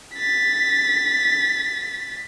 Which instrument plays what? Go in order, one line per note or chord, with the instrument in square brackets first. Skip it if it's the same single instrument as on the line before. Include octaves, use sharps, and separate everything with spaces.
[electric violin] A6 B6